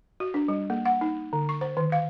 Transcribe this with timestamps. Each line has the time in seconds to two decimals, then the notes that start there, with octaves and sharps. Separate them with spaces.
0.20 F#4
0.34 D4
0.48 G3
0.70 A#3
0.86 F#5
1.01 D#4
1.33 D3
1.49 C#6
1.61 C5
1.77 D#3
1.92 F5